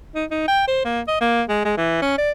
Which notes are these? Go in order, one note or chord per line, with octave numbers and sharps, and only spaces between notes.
D#4
D#4
G5
C5
A#3
D#5
A#3
G#3
G#3
E3
C#4
D5